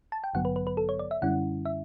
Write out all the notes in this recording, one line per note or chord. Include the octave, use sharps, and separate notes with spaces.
A5
G5
A1 G2 D3 F#3 B3 F#5
B4
B4
B4
A4
C#5
D5
E5
F#2 D3 G3 C#4 E4 F#5
E5